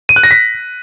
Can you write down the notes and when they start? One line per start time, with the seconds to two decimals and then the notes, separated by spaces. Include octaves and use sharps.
0.09 D#7
0.16 F#6
0.23 A#6
0.31 B6